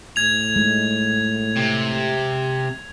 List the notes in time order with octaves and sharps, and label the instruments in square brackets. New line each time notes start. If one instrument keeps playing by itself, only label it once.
[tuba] A2 [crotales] G#6 F7
[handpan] G#3
[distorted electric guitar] C3